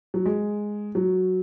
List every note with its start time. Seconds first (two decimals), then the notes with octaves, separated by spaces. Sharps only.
0.14 F#3
0.25 G#3
0.95 F#3